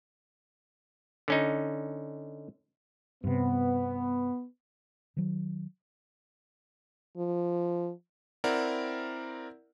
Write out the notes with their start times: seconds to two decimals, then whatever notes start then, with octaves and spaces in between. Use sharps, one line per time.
1.28 D3 C#4 D#4
3.24 G2 C3 B3
5.17 D#3 F#3
7.17 F3
8.44 C4 E4 A#4 D5 F#5